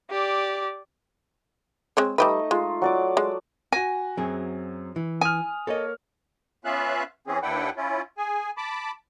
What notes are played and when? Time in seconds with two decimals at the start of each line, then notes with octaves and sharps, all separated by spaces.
0.10 G4 D5
1.97 G#3 C4 C#5
2.18 G3 A3 D#4 G4 B4 D#5
2.51 G#3 F4
2.82 F#3 D5 D6
3.17 G#3
3.72 F#4 G#5 A#6
4.17 F#2 F#3 C4 G#4
4.96 E3
5.21 G#5 D#6 F6
5.67 A#3 A4 C#5 D#5
6.65 B3 C#4 F4 E5 F5 F#6
7.27 E3 C4 C#4 G#4
7.42 D#2 D4 E4 B4 F#5 G5
7.77 C#4 E4 F4
8.18 G#4 G#5
8.57 A5 B5 D6